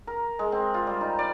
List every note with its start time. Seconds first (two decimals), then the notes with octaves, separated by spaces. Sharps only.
0.07 A#4
0.39 G#3
0.52 C4
0.74 F4
0.87 G3
1.01 D#4
1.19 D5